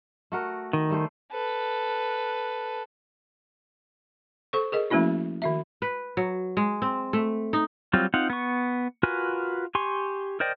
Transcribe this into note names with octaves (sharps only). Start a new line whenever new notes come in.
A3 F#4 A#4
D#3
G3 A3 C5
A4 B4
A4 C5 C#6
G#4 A#4 D#5
F3 A3 A#3 C#4 E4 F#4
D#3 F#4 E5
B4
F#3
G#3
C4
A3
D#4
F#3 G3 C4 F4
C4 D#4 F4 F5 F#5
B3 C#6
F4 F#4 A#4 B4 G#5
G4 G#5 C6 C#6
A#4 C5 D5 D#5 G5